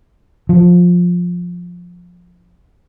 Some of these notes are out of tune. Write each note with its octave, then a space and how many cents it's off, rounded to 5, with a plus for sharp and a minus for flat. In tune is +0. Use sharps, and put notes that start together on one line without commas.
F3 +15